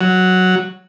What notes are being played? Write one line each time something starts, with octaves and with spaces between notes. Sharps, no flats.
F#3